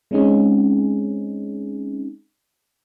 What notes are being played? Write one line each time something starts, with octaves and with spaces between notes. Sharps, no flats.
G#3 C4 C#4 D#4 G#4